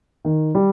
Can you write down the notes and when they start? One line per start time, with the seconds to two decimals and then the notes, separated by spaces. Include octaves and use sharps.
0.25 D#3
0.55 G3